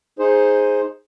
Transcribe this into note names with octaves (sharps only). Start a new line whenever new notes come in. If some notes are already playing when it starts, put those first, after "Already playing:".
D#4 G#4 C5